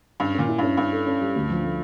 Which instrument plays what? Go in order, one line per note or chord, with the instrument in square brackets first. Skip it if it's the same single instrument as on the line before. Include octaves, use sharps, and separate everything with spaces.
[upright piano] G2 [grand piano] C#4
[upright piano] A#2 [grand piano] C#4
[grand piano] E4
[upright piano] G2 [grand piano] C#4
[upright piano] G2 [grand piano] C#4
[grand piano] A4
C#4
G3
D2
F3
A3